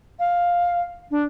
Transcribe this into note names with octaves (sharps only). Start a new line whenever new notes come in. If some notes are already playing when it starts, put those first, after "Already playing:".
F5
D4